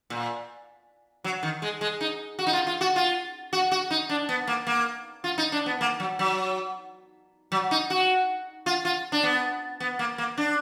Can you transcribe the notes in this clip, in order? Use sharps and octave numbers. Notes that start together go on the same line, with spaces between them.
A#2
F#3
D#3
G#3
G#3
D#4
F#4
D#4
F4
F4
F#4
F4
F#4
F#4
D#4
D4
B3
A#3
A#3
F4
D#4
D4
B3
A#3
F#3
F#3
F#3
D#4
F#4
F4
F4
D4
B3
B3
A#3
A#3
D4